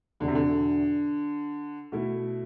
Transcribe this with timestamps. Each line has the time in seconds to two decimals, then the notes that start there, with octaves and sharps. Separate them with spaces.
0.20 E2 B2 D3 B3 D4
0.28 C3
0.35 D3
1.92 B2 A3 E4